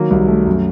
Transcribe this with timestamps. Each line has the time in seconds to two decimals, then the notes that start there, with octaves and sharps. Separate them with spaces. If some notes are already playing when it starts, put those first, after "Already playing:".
Already playing: D#3 F#3 A#3
0.11 C2
0.28 A3
0.46 F#2